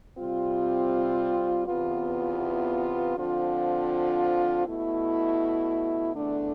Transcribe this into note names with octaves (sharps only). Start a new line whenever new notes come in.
C3 G3 C4 F4
E2 C3 E3 B3 F4
D3 F3 C4 F4
B2 A3 E4
E2 D3 A3 D4